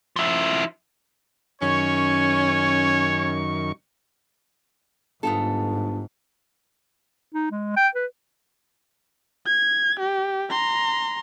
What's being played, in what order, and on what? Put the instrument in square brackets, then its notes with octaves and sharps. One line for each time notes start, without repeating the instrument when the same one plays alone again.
[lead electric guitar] F3 E4
[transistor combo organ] F#2 D#3 C#6 [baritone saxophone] C#4 [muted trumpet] C#5
[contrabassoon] G1 [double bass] G#2 [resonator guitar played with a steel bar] B3 F4 A4
[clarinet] D#4
G#3
G5
B4
[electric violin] G#6
G4
A#5 C6